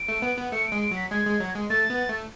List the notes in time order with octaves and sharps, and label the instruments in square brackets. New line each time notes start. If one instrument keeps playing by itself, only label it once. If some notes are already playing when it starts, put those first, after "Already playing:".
Already playing: [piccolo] D7
[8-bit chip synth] A3
B3
B3
[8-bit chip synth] A3 [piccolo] C#7
[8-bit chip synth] G#3 [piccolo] D7
[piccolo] D7
[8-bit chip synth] F#3
[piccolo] B6
[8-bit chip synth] G#3 [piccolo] G#6
[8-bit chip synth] G#3
F#3
G#3
[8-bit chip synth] A3 [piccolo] A6
[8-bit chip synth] B3
A3